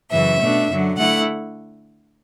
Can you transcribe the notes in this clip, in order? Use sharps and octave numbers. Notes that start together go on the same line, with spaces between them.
F#2 C#3 E3 E5
B2 A3 D4
F#2 D3 F#3
D3 A3 E4 F#5